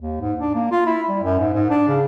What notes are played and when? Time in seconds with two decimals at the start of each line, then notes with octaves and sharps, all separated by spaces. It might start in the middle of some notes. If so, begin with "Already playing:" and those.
0.01 D#2
0.21 G#2
0.40 D4
0.55 A#3
0.71 F4
0.86 E4
1.09 G3
1.23 F#2
1.39 G#2
1.54 G#2
1.70 D4
1.88 C#3